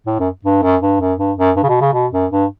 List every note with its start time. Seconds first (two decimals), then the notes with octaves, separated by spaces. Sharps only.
0.06 A2
0.19 F#2
0.45 G2
0.62 F#2
0.82 G2
1.00 F#2
1.19 G2
1.38 F#2
1.56 G2
1.63 C#3
1.69 B2
1.81 C#3
1.93 B2
2.13 F#2
2.32 G2